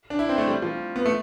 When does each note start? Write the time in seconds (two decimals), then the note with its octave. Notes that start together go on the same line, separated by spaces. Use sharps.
0.10 D4
0.19 E4
0.29 C4
0.38 A3
0.47 G3
0.62 F3
0.96 B3
1.06 A3